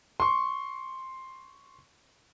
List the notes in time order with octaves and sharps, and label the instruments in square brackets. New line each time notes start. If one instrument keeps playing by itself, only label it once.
[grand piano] C6 C#6